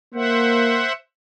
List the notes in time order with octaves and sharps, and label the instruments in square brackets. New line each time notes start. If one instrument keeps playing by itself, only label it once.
[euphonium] A#3 [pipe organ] C5 E5 F#5